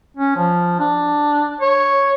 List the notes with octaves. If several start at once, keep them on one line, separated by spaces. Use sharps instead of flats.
C#4
F3
D4
C#5